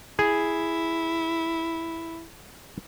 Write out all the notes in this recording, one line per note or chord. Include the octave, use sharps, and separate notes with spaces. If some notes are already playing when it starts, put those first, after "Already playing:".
E4 G#4